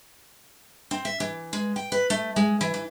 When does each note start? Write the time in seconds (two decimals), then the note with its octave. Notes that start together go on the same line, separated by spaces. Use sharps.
0.91 C4
1.05 E5
1.20 E3
1.53 G#3
1.76 G5
1.92 B4
2.10 A3
2.36 G#3
2.61 E3
2.74 E3